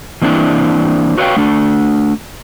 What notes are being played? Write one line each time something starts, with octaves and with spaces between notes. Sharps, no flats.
E3 A#3 C4 D4 E4
F#4 B4 C#5 E5 F5 G5
A3 D4 A4